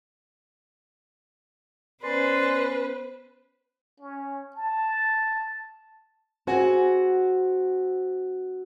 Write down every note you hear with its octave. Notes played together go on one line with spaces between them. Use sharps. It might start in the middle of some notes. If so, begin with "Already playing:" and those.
B3 C#4 B4 C5 D5 G#5 C6
C#4
A5
C4 F#4 G#4 G#5